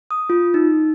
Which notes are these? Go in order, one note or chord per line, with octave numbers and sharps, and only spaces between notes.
D#6
F4
D#4